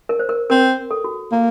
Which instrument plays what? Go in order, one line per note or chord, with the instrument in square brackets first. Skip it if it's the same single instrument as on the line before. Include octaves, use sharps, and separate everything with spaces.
[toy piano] A#4
C5
A#4
[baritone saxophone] C4 [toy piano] A#4
[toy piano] A4
F#4
[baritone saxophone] A#3